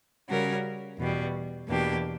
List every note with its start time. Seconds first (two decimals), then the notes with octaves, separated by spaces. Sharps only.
0.29 C#3 G3 C#4 F#4 A#4
0.99 E2 B2 G3
1.68 E2 B2 A#3 D4 G4